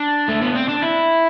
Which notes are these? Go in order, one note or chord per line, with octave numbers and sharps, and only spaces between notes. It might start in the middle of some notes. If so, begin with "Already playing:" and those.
Already playing: D4
A3
B3
C4
D4
E4